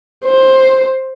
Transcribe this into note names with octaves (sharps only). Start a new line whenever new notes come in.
C5